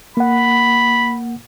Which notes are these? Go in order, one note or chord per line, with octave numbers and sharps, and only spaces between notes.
A#3 F#5 B5